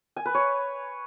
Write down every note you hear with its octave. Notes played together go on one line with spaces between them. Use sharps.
G#5
B4
C#5